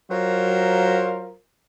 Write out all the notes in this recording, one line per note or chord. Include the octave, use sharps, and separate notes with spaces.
F#3 F4 A#4 C5